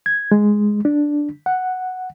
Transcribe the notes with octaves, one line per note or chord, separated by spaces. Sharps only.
G#6
G#3
D4
F#5